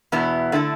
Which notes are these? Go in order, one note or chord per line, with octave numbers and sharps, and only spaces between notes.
E2 B2 B3 E4
D3 A3 E4 A4